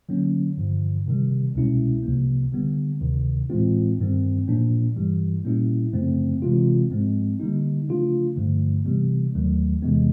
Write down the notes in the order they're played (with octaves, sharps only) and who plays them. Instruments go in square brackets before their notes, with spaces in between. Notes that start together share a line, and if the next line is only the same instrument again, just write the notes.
[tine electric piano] D3 F#3 A#3 C#4
G2 D3 F3
C3 D#3 G3
C2 B2 G#3 C#4 E4
C2 C3 F3 A#3
D3 G3 B3
D2 C3 D#3
A2 E3 G#3 C4 F4
G2 D#3 G3 C4
A#2 F3 A#3 D4
G2 E3 G3
A#2 G3 A#3 C#4 E4
F#2 C#3 F3 A3 C4
C3 E3 G#3 C4 F4
G#2 F3 G#3 C4
D3 G3 A#3 D#4
C#3 F3 A3 D4 F4
G2 D3 F3 A3
C3 E3 G3 B3
D#2 D#3 F#3 A3
E2 C3 E3 G#3 B3